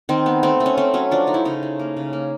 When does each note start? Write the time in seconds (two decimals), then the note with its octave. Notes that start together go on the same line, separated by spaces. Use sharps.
0.09 D#3 C4
0.26 B3
0.43 A3 C4
0.60 A3
0.66 C#4
0.77 A3 C4
0.94 F#3 C#4
1.11 F3 D4
1.27 A3 D#4
1.34 E4
1.45 C#3 D#4
1.63 A3
1.79 A#3
1.97 C#3
2.13 A#3